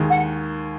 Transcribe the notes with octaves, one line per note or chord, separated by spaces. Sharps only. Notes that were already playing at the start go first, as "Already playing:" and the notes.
Already playing: D#2 D#3 G#3
F#5